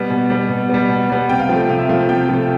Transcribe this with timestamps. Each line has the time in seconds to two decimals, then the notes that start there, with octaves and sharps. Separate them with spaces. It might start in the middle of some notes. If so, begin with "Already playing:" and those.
Already playing: B2 G3 B3
0.10 B2
0.30 G3 B3
0.49 B2
0.69 G3 B3
0.89 B2
1.09 G3 B3
1.29 C3 G5
1.39 F5
1.49 F3 G5
1.53 A3
1.69 C3 F5
1.79 E5
1.89 F3 A3 F5
2.09 C3 G5
2.29 F3 A3